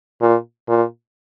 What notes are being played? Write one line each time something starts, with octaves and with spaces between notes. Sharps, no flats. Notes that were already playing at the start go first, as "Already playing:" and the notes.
A#2
A#2